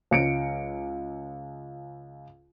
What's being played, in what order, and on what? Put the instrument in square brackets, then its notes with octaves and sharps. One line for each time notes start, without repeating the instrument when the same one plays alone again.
[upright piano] C#2 C#7 D7